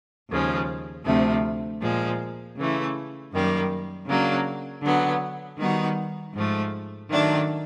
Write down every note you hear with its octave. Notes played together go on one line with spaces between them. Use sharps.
D#2 C#3 F3 G#3
D2 C3 F3 A3 C4
A#2 F3 G#3
C#3 E3 A3
F#2 D#3 G3 A#3
C#3 F#3 A#3 D4
D3 F#3 B3
D#3 G3 B3 D#4 F#4
G#2 F3 A3
D#3 F#3 A3 D4